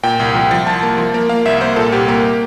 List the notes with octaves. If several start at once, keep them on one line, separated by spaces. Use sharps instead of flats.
A#2 G5
C2
F3
F3
C2 A5
A#3
F3
A#3
A#3 F5
C2 E5
A#3 C5
A#2 A4
C2 G4
A#3